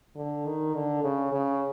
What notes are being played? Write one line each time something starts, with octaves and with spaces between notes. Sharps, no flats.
D3
D#3
D3
C#3
C#3